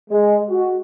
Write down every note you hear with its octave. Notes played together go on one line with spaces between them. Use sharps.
G#3
F#4